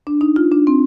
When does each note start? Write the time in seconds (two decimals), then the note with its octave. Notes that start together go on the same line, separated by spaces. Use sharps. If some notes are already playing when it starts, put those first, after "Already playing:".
0.07 D4
0.21 D#4
0.36 F4
0.51 D4
0.67 C4